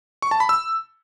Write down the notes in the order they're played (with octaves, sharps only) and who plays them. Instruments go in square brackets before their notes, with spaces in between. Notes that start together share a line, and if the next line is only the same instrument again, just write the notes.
[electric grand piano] C#6
A5
B5
E6